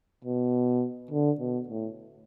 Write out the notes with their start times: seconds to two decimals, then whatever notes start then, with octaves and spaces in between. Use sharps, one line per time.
0.24 B2
1.11 D3
1.40 B2
1.68 A2